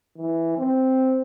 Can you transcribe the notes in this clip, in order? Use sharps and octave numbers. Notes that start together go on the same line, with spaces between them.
E3
C4